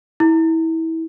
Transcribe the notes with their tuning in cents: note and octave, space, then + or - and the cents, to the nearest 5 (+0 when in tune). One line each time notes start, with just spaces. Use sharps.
E4 -25